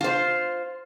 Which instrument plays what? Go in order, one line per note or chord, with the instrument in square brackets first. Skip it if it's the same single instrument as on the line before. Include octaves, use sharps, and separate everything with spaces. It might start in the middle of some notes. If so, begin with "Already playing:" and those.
[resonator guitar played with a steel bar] F4 C5